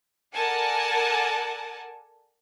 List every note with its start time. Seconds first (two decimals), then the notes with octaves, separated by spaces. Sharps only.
0.35 A4 A#4 D5 F#5 G#5 A5